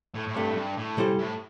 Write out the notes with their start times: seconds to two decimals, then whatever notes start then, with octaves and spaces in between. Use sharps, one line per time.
0.15 A2
0.28 A2
0.35 C2 G2 C3 A3
0.49 A2
0.55 G2
0.77 A2
0.97 C3 G3 E4 A4 C5
1.18 A2